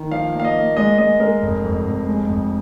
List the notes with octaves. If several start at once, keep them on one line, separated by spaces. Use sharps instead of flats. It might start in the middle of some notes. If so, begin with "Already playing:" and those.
Already playing: D#3
F3 F5
A#3
F5
D#5
A#3
G#3 D#5
G#3 D#5
G#3 A#4
F1
F2
F1
G#3
F2